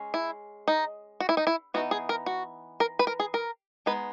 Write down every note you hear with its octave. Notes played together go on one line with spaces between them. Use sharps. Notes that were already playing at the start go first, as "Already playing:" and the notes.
Already playing: G#3 C#4
E4
D#4
F#4
E4
D#4
E4
E3 B3 D#4 F#4
G#4
A#4
F#4
A#4
B4
A#4
G#4
A#4
G#3 B3 D#4 B4